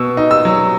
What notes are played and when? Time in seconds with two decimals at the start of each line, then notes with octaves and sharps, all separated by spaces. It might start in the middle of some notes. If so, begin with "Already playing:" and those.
Already playing: B2 E6
0.17 D#4
0.31 E6
0.45 F#3